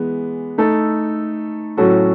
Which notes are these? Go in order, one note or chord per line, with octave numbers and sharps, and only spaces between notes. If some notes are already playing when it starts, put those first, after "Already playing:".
Already playing: E3 G#3 B3
A3 D#4 A4
A2 F#3 C#4 F#4 A4